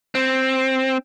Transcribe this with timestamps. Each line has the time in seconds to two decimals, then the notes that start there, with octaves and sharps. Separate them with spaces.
0.15 C4